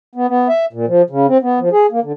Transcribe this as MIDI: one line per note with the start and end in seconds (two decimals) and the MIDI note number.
0.15 0.27 59
0.28 0.48 59
0.49 0.65 76
0.73 0.86 46
0.87 1.02 53
1.10 1.26 49
1.28 1.38 60
1.42 1.59 59
1.60 1.69 53
1.72 1.86 68
1.92 2.00 58
2.03 2.12 50